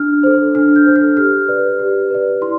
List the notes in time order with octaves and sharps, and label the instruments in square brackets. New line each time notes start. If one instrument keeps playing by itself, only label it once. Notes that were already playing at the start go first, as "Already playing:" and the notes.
Already playing: [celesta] D4 F6
A4 C5
D4 F6
G6
A4 C5
F6
G4 F6
B4 D5
G4
B4 D5
E4 C6